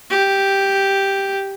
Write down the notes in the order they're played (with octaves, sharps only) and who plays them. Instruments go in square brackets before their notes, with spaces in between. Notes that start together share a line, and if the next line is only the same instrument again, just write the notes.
[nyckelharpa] G4